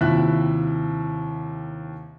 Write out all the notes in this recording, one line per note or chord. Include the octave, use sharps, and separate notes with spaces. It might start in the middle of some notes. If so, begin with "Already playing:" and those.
D#2 C3 F3 E4 E5 F#6